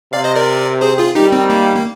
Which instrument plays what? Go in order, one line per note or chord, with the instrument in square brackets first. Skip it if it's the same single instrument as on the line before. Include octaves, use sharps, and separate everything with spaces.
[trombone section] C3 [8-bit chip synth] D5 F5
[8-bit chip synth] C5 D#5
A#4 D5
G#4 C5
F4 G#4
[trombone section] D#3 G3 [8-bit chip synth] D#4 G4
[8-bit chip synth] C4
A#3
A#3